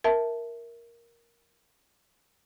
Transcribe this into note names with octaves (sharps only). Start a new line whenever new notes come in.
A#4 E5 A5